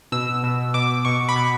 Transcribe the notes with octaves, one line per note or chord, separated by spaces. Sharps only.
B2 E6
B2
B2 D6
B2 C#6
B5
B2